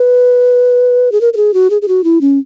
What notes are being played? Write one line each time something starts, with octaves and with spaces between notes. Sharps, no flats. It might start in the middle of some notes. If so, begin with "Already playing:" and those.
Already playing: B4
G#4
A#4
A#4
G#4
F#4
G#4
G#4
F#4
E4
C#4